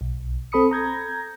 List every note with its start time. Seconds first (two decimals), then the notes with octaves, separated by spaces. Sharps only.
0.01 B1
0.52 C4 A4 B5 D#6 C#7
0.71 A#5 G6 G#6 A#6